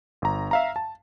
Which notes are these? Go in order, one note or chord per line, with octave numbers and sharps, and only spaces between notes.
G1 A#5
E5 F5 A#5
A5